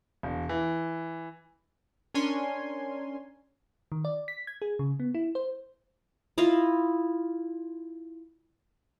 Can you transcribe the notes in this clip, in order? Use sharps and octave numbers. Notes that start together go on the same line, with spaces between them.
E1
E3
C#4 D4 A#4 C#5 G#5 C6
D#3
D5
B6
G#6
G#4
C#3
B3
E4
C5
E4 F4 D#5 F5